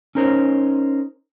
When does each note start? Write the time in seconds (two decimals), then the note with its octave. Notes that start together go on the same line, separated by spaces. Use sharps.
0.15 C#4 D#4 A#4 C5 C#5